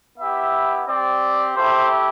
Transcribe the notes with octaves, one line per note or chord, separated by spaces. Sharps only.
B3 E4 G4 E5
C4 G4 D5
A3 E4 G4 C5